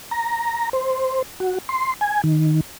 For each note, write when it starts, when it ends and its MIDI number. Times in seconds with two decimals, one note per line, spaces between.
0.11 0.70 82
0.73 1.23 72
1.40 1.59 66
1.69 1.94 84
2.01 2.22 80
2.24 2.61 51